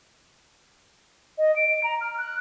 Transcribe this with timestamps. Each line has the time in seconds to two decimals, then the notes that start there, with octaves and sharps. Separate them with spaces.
1.38 D#5
1.56 D7
1.84 A#5
2.01 F6
2.18 F#6